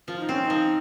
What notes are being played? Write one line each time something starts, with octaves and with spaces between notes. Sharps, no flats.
F3 F4
D#4
C4 C#4
D#4
F3